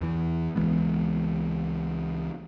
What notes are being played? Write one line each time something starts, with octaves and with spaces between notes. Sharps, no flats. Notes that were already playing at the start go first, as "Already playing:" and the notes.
E2 E3
C#2 E3 G#3 B3